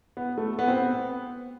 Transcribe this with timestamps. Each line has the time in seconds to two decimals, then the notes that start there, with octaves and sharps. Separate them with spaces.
0.17 B3
0.38 A3
0.59 B3
0.68 C4
0.77 B3